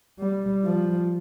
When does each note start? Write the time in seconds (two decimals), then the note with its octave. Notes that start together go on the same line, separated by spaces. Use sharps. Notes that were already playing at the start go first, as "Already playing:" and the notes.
0.19 G3
0.64 F3